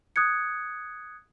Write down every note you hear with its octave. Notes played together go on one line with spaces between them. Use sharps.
D#6 F#6 G#6 C#7